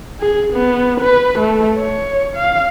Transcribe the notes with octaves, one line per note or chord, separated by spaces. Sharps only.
G#4
B3
B4
A3
C#5
F5